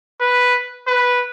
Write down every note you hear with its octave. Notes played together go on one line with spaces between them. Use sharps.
B4
B4